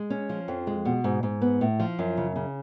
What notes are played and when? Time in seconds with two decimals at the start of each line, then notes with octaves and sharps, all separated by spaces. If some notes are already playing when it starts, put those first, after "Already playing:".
Already playing: G#3
0.10 C#4
0.29 F3
0.48 F2
0.67 G#3
0.85 B2
1.04 G#2
1.23 G#2
1.41 B3
1.61 A2
1.80 F3
1.99 F#2
2.17 C#3
2.36 C#3